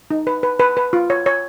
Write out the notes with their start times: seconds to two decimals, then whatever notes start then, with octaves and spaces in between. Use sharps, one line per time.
0.11 D#4
0.27 B4
0.43 B4
0.59 B4
0.77 B4
0.93 F4
1.10 C#5
1.26 C#5